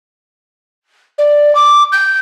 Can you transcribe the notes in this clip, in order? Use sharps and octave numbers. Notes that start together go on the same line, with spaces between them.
D5
D6
G6